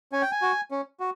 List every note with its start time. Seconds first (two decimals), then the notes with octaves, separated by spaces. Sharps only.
0.12 C#4 G#5
0.22 G5
0.32 G#5
0.42 F#4
0.71 C#4
1.00 F#4